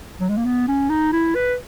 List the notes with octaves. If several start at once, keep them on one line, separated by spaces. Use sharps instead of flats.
F#3
G#3
A#3
B3
C#4
D#4
E4
B4